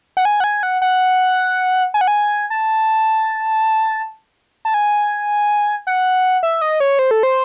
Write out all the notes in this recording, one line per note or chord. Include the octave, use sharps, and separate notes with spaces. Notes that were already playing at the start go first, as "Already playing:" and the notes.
F#5
G#5
F#5
G#5
F#5
F#5
G#5
F#5
G#5
A5
A5
G#5
F#5
E5
D#5
C#5
C5
A4
C5